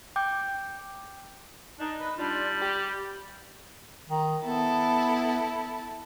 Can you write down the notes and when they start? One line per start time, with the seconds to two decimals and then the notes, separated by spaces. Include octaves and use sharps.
0.16 G5 D6 G6
1.79 D4 D#4
2.00 B4
2.18 G3 D4 F4
2.61 G4
4.08 D#3
4.44 B3 E4 A4